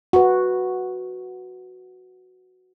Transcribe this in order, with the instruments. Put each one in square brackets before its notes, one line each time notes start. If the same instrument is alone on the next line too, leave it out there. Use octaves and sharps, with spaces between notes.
[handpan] F#4 B4